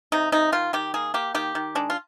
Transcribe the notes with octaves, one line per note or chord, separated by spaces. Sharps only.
C3 D#4
C3 D#4
D#3 F4
D#3 G4
A#3 G#4
A#3 G4
D#3 G4
D#3
G#3 D4
F4